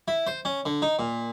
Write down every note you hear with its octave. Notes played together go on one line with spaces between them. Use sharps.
E4
C5
C#4
D3
D#4
A#2